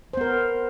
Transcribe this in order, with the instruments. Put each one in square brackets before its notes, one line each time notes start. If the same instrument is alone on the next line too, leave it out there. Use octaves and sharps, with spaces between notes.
[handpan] C5
B3
A#4